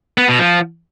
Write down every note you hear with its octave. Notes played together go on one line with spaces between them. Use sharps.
B3
B2
F3